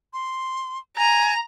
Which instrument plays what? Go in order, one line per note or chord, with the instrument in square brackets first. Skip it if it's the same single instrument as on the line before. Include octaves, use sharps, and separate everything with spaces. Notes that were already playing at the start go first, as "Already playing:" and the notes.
[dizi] C6
[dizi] G#5 [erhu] A#5